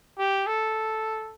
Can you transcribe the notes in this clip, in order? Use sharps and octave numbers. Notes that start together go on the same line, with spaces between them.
G4
A4